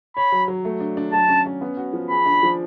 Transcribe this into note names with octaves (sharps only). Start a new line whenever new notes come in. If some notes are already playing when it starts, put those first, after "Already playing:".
C#5 B5
F#3
F#3
A3
D4
D4
F#3 A5
C#4
C#4
B3
F#4
F3
G#4 B5
D4
F3